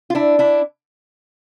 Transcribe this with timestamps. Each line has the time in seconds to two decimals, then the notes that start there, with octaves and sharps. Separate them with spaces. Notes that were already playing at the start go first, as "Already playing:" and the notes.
0.10 F4
0.15 D4 E4
0.39 D4 E4